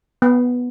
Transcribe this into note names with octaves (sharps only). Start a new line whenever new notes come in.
B3